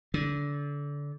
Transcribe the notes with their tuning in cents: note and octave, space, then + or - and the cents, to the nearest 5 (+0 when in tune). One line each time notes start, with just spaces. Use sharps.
D3 -25